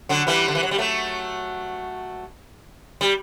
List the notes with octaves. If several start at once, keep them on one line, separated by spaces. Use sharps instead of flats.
D3 F#3
E3 G3
D3
E3
F#3
G3
F#3 A3
G3